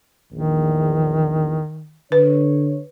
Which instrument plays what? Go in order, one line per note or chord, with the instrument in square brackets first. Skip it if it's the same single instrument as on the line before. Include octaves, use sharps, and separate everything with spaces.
[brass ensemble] A#1 E2 [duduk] D#3
[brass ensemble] D3 C#5 [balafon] B4